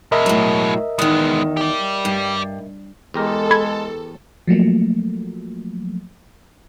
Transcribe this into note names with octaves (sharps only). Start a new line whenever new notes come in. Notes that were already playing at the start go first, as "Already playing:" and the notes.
B2 G#3 A#4 D#5 E5
A2 F#3
E2 D#3 G#3 B3
G4 D5
G2
E2 G#3 G4 A4 A#4
B5 G#6
F3 F#3 A3 A#3